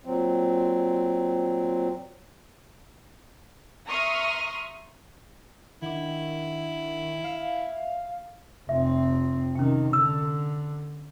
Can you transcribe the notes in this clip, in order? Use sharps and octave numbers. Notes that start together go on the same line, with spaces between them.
A#2 F#3 C4
E5 A#5 C6 C#6 D#6 F6
D#3 D4 E4 F#5
E5 F5
F1 C4 E5
C3 D#3 C#4 G5
D3 E6